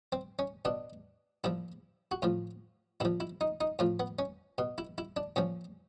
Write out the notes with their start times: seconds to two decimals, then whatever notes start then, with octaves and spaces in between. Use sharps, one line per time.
0.12 C4
0.39 C#4
0.65 B2 D4
1.44 A#2 F3 E4
2.11 F#4
2.22 A2 F3 F4
3.00 A#2 F3 E4
3.20 E4
3.41 D#4
3.61 D#4
3.79 A2 F3 F4
4.00 B3
4.19 C#4
4.58 B2
4.78 E4
4.98 E4
5.17 D4
5.36 A#2 F3 C#4